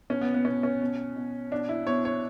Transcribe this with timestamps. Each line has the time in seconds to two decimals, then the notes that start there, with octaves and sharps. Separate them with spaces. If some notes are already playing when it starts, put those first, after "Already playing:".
0.10 B2 C#4
0.21 B3
0.34 B3
0.45 B2 C#4
0.63 C#4
0.81 B2
1.16 B2
1.52 B2 D4
1.69 E4
1.87 B2 C#5
2.05 C#5